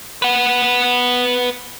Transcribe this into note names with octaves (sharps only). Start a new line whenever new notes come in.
B4 F#5